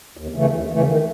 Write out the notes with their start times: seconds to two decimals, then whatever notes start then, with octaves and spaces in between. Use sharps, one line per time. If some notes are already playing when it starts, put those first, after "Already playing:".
0.17 D#2
0.35 C#3 E3 A3
0.53 D#2
0.71 C#3 E3 A3
0.87 D#3